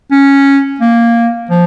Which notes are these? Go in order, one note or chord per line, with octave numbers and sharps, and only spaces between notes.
C#4
A#3
F3